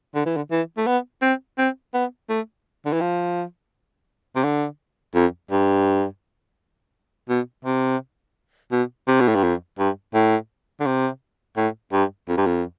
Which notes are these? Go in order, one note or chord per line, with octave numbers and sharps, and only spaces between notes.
D3
E3
D3
E3
A3
B3
C4
C4
B3
A3
D3
E3
F3
C3
D3
F2
G2
B2
C3
B2
C3
B2
A2
G2
F2
G2
A2
D3
C3
A2
G2
F2
G2
F2